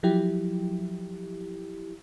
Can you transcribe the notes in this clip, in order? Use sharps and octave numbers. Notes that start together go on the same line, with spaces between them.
F3 F#3 E4 G4